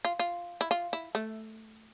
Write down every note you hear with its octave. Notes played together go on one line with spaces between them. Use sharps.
F4
F4
E4
F4
E4
A3